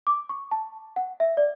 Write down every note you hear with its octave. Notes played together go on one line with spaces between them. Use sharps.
D6
C#6
A5
F#5
E5
D5